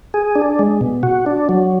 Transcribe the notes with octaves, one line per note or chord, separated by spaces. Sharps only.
G#4
D4
G#3
B2
F#4
D4
F#3